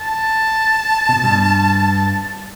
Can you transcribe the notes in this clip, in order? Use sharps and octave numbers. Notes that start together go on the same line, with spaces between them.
A5
B2
G2